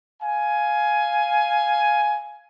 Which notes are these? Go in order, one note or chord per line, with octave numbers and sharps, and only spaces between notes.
F5 G#5